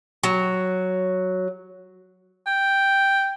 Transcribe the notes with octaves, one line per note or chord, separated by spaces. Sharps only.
F#3
G5